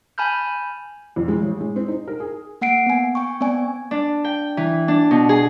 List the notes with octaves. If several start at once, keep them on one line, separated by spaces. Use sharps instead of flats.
G#5 A5 B5 F6 G6
F2
G#3
A1
G#3
C4
D#4
A#4
G#4
A#3 F#5 C7 D7
B3 G#5
G5 C#6
B3 C4 D5 G#5
D4
G5
E3
D4
B2
G#4